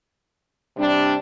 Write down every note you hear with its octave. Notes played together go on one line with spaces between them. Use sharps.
C3 G3 D4